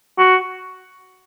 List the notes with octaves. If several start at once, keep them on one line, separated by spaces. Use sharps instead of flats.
F#4